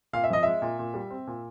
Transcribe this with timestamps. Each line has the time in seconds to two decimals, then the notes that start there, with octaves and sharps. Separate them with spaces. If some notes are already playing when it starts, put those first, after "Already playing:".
0.13 A#2 F5
0.24 E5
0.30 F3 D#5
0.43 G#3 E5
0.62 A#2
0.79 A#2
0.94 G3
1.11 C4
1.27 A#2